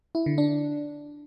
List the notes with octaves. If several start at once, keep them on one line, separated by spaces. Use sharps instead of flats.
E4
D3
D4